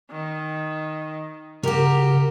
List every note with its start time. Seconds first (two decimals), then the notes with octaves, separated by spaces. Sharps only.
0.11 D#3
1.63 C#3 F#4 G4 A#4